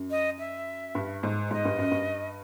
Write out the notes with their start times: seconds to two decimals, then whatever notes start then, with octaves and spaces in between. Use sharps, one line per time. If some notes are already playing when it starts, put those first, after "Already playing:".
Already playing: F#2
0.11 D#5
0.39 E5
0.95 G2
1.23 G#2
1.51 G#2 D#5
1.65 G2
1.78 F#2
1.91 G2